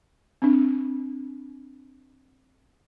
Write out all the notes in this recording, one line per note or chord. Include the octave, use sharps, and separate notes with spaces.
C4 D4